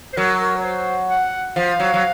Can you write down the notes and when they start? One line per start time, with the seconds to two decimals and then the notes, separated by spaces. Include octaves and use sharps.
0.13 C5
0.17 F#3 A#4
0.41 A#4
0.56 C#5
0.64 C5
1.10 F#5
1.56 F3 F5
1.80 F#3
1.94 F#3